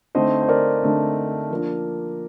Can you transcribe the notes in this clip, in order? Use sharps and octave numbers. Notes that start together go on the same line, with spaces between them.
D3 A3 C4 D#4 C5 D#5
C5
A#4 D5
D3 A3 C4 D#4
F3 A#3 D4